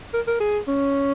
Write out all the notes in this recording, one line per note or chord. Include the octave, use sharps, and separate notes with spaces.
A#4
A#4
G#4
C#4